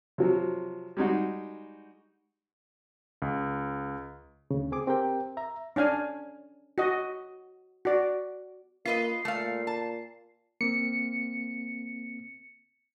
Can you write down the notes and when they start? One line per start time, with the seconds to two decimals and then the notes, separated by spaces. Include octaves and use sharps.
0.18 C3 F3 F#3
0.97 G3 G#3 D#4 F#4
3.22 C#2
4.51 D2 C#3
4.72 C4 G#4 D6
4.87 C4 G4 A#4 G5
5.37 E5 A#5
5.76 C#4 D4 F5 G#5
6.78 F#4 D#5
7.85 F#4 D5
8.86 A#3 F4 B4 D#5 C7
9.25 A#2 A3 F5
9.67 A5
10.61 A#3 C4 C#7